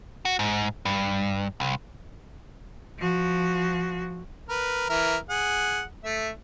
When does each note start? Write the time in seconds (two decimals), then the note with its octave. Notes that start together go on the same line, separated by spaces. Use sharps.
0.25 F#4
0.39 G#2
0.85 G2
1.60 C2
2.98 F3 F#4
4.49 A#4 B4
4.90 E3 A#4 E5
5.30 G#4 F#5
6.04 A3 E5